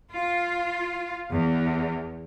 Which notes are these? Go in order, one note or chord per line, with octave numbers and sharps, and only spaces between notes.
F4
E2